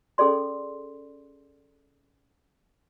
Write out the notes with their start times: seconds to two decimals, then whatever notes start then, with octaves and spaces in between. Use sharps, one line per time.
0.18 C#4 G#4 A4 D5 C6